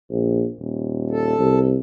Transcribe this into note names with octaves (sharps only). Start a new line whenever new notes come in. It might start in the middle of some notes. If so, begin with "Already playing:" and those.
A#1
D#1
A4
C2